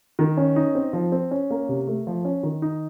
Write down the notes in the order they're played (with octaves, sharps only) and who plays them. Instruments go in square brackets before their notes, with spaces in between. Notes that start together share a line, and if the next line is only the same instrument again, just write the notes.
[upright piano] D#3
C#4
D#4
C4
F3
C4
C#4
A#3
C3
A3
F3
C#4
D#3
D#4